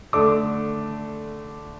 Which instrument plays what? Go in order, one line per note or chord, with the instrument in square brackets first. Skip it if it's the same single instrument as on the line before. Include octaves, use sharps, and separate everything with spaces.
[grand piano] D3 A3 D4 D6